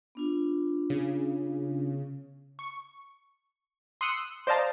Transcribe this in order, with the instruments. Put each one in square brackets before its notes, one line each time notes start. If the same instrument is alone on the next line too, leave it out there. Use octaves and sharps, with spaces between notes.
[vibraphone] B3 D4 F4
[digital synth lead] C#3
C#6
[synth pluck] C6 D#6 E6 F#6 C#7
C5 D5 D#5 F5 A5 A#5